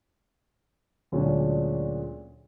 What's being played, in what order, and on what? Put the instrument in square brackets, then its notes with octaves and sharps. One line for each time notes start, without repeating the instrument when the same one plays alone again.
[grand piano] D2 A#2 F#3 G#3 C#4 D4